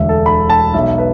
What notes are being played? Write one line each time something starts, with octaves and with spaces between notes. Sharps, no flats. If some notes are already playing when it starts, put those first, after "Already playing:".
Already playing: E1 D2 D3 E5
A4
B5
A5
B1 B2 E5
B4